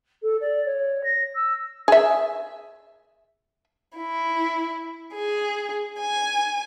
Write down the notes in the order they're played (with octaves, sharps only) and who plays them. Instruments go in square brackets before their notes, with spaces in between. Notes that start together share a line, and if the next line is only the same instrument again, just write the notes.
[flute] A4
D5
C#5
A#6
E6
[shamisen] G#4 E5
[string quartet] E4
G#4
G#5